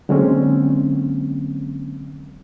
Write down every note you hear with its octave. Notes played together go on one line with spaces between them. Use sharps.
D3 F#3 G#3 A#3 C4 C#4